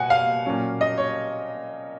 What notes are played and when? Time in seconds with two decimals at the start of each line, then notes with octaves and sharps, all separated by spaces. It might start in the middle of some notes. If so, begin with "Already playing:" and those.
Already playing: B2 F#5 G#5
0.10 F5
0.46 A#2 F#3 C#4
0.81 D#5
0.98 C#5